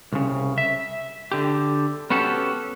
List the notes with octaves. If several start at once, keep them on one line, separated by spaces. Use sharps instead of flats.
C2 C#3
E5
D3 G4
B3 C#4 F#4 G4 A4